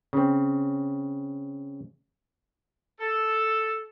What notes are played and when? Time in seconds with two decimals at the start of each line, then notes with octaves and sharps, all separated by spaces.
0.13 C#3 C4
3.00 A4